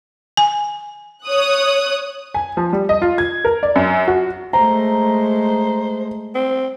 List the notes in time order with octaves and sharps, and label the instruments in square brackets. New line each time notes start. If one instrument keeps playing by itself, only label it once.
[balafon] G#5
[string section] C#5 D#6 F#6
[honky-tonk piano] G#5
F3
G3
D#5
F4
G#6
A#4
D5
F#2
F#4
[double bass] G#3 A3 [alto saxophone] C5 [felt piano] A#5
[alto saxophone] C4